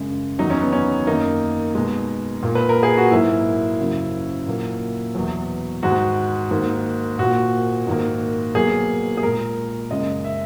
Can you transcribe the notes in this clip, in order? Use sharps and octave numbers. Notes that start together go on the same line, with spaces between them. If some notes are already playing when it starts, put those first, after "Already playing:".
Already playing: F#2 C#3 G#3
E2 D#3 F#3 D#4
C#4
B3
C#4
F#2 D#3 A#3 D#4
B2 G#3
A#2 A#3
B4
A#4
G#4
F#4
G#2 F#3 A#3 E4
F#2 C#3 F#3
A#2 F#3 A#3
E2 B2 F#3
G#2 D#3 G#3 F#4
G#2 D#3 A#3
A#2 A#3 F#4
G#2 D#3 A#3
B2 F#3 A#3 G#4
G#4
A#2 G#3 A#4
F#2 C#3 G#3 D#5
E5